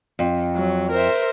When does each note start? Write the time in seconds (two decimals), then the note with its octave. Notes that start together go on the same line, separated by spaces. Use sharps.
0.19 F2
0.56 F#3
0.91 A#4 C5 E5